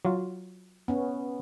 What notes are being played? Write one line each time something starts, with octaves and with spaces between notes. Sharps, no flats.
F#3 F4
B3 C#4